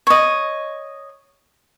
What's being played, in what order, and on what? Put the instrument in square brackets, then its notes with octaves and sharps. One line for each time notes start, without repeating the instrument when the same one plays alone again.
[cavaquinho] C#5 D#5